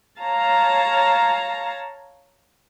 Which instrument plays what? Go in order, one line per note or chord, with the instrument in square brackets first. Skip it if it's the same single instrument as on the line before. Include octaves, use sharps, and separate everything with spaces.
[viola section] C#5 F5 A5 A#5